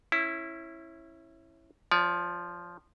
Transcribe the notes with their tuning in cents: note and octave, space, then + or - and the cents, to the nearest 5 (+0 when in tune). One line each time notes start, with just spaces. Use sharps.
C#4 -25 E4 +0
F3 +0 D5 -45